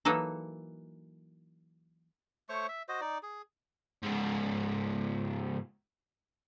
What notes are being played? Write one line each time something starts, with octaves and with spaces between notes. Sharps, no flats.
E3 F#3 A#3 D#4 A4
A3 C5 C#5 C#6
E5
F#4 C5 D#5
D#4 D5
G#4
C#2 G#2